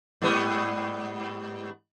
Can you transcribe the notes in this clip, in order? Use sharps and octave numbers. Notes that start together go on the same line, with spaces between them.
G#2 G3 B3